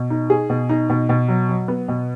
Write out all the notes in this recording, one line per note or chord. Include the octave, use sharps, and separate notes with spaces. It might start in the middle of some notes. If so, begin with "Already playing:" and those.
Already playing: B2
D#4
G#4
B2
D#4
B2
B2
F#3
F#3
B3
B2